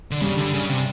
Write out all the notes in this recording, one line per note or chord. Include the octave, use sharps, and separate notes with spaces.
D3
G2 C#3 G3
D3
C#3
C3